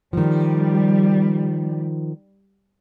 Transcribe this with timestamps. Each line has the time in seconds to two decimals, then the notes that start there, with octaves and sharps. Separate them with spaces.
0.13 D#3 F3 G3